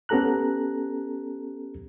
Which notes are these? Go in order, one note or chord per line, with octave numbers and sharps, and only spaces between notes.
B3 C#4 G4 A4 A#5 F#6